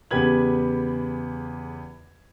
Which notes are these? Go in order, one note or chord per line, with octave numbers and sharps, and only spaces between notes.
E2 C#3 G4 B4 G#6 F#7